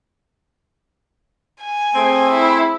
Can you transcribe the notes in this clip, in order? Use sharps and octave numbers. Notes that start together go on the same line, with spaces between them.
G#5
A3 C4 G#4
E4